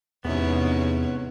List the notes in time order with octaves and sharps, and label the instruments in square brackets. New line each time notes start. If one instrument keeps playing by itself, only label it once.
[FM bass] E2 [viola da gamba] G#2 C3 C#4 [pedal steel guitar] B3